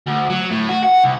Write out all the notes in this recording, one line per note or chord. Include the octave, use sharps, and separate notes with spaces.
D2
F#3
A2
F#4
F#5
C2